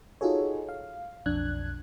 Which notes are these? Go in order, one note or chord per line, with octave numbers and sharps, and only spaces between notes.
D#4 F4 F#4 G#4 A4 C#5
F5
B1 F2 D4 F#6 G#6